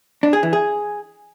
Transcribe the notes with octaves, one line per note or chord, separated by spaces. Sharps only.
D4
G#4
E3
G#4